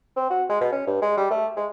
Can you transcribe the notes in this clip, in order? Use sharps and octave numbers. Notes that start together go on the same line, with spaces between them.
C4
F#4
G#3
B2
C#4
G2
G#3
G3
A3
G#3